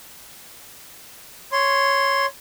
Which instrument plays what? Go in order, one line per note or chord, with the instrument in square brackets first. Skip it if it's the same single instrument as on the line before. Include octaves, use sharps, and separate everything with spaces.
[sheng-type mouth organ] C#5 C6